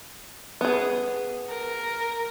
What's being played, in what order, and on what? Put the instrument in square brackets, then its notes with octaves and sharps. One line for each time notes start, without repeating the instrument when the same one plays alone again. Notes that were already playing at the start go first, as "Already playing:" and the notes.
[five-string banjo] B3 G#4
[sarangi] A#4